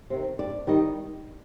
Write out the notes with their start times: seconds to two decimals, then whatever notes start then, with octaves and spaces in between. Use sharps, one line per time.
0.10 C3 D#3
0.39 G2 D5
0.67 D#3 G3 D#5